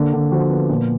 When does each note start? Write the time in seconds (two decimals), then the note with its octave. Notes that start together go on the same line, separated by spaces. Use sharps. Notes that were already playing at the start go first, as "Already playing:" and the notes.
Already playing: D3 A#3
0.13 D3
0.31 F3 F#4
0.50 B3
0.70 A#2